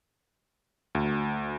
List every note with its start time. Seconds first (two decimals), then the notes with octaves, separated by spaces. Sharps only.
0.95 D2